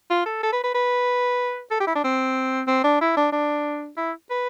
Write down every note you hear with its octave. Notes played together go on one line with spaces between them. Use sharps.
F4
A4
A4
B4
B4
B4
A4
G4
E4
D4
C4
C4
D4
E4
D4
D4
E4
B4